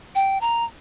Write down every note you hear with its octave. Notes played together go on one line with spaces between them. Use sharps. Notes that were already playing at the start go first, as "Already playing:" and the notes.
G5
A#5